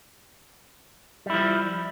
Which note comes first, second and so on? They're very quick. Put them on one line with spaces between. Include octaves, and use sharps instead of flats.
G3 E4 F3